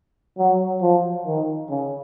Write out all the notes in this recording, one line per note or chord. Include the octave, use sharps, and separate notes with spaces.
F#3
F3
D#3
C#3